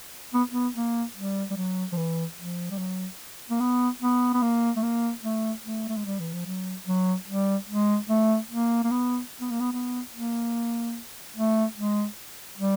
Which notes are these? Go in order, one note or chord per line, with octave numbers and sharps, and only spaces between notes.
B3
B3
A#3
G3
G3
F#3
F3
E3
F3
G3
F#3
A#3
B3
B3
B3
A#3
A3
A#3
A3
A3
A3
G#3
G3
E3
F3
F#3
F#3
G3
G#3
A3
A#3
A#3
B3
B3
A#3
B3
B3
A#3
A3
G#3
G3